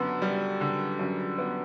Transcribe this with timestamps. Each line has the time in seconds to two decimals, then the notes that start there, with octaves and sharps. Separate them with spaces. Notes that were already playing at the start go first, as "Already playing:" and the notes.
Already playing: F#2 D3 B3
0.22 G3
0.61 D3
0.99 F#2
1.38 B3